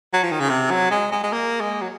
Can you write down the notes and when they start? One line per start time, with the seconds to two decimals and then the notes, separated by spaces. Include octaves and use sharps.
0.14 F#3
0.23 F3
0.32 D#3
0.40 C#3
0.50 C3
0.71 F#3
0.91 G#3
1.12 G#3
1.23 G#3
1.33 A#3
1.61 G#3
1.82 F#3